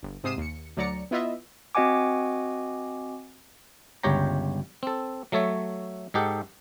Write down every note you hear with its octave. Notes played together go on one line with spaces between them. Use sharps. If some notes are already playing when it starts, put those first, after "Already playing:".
G1
G#2 C3 D#6 C7 D#7 E7
D#2 C#7
D2 F#3 D5 A#5 C#7
B3 E4 F4 D#5 E5
C4 F#4 D#5 F#5 G#5 D6
G1 C#2 G4 C#5 G5 A#5
C4 A4
F#3 A3 A4 C#5 E5
G#2 D#4 G4 A4 F#5